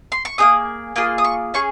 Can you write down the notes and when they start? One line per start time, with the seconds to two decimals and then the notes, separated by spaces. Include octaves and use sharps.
0.12 C6
0.25 C#6
0.38 A#3 D#4 G#4 D#6
0.96 A#3 F4 G#4 D#6
1.18 D#6
1.24 C#6
1.54 C#4 G#4 C#6